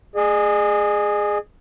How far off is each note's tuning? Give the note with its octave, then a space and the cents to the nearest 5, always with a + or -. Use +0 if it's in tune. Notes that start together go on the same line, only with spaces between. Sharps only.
G#4 +0 D#5 -45